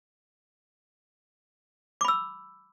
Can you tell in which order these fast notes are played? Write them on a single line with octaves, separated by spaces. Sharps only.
D6 B5 E6